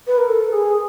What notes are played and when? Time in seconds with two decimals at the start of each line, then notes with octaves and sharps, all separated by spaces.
0.07 B4
0.18 A#4
0.29 A4
0.53 G#4